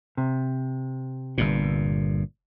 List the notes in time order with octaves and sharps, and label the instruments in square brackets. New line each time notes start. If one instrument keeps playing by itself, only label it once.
[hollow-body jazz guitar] C3
[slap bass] G1 G2 A#2